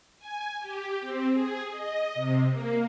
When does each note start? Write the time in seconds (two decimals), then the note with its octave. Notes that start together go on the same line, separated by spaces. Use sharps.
0.19 G#5
0.60 G4
1.00 C4
1.32 G#4
1.70 D#5
2.15 C3
2.51 A#3